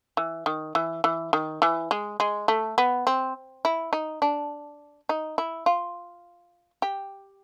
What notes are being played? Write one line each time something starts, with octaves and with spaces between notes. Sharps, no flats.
E3
D#3
E3
E3
D#3
E3
G#3
G#3
A3
B3
C4
E4
D#4
D4
D#4
E4
F4
G4